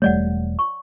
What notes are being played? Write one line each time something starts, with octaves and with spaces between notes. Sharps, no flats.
E1 G3 A3 C#5 D5 F#5
C#6